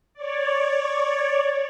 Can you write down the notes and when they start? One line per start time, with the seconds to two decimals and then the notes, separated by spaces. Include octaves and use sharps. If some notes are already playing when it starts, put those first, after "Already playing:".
0.14 C#5 D5